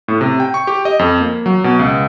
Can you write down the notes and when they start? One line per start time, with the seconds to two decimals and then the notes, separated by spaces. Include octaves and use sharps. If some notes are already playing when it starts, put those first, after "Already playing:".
0.08 A2
0.21 C3
0.40 G5
0.54 C#6
0.67 G4
0.85 D#5
0.99 F2
1.20 A#3
1.46 F#3
1.64 B2
1.79 C#2